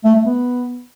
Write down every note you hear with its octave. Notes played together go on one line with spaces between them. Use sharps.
A3
A3
B3